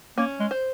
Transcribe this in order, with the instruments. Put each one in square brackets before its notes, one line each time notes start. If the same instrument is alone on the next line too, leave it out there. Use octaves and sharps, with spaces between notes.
[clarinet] A#3 [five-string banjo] C#4
[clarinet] G#3
[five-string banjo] C5